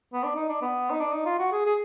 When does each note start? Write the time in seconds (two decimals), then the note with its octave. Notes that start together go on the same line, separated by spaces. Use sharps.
0.13 B3
0.24 D4
0.35 D#4
0.49 D4
0.62 B3
0.90 D#4
1.01 D4
1.13 D#4
1.26 F4
1.39 F#4
1.52 G#4
1.66 G#4